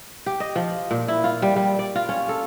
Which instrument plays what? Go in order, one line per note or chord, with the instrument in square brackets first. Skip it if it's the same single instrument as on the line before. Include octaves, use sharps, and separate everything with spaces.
[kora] G4
D#5
F3
A#2
E4
F4
G3
G3
D5
F4
C#4
A4